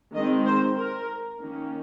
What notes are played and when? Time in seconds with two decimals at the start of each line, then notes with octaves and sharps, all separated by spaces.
0.14 D#3 G#3 C4 D#5
0.45 C5
0.77 A#4
1.40 D#3 A#3 C#4